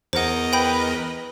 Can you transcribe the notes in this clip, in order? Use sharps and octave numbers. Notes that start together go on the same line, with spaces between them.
E2 A#4 C5 D#5 F#5
B4 G5 B5 G6